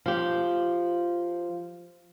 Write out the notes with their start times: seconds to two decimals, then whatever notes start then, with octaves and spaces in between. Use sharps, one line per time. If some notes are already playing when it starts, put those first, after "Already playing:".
0.06 F3 G4